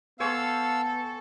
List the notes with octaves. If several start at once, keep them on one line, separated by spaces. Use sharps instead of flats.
B3 A4 C5 F5 G#5 C#6 E6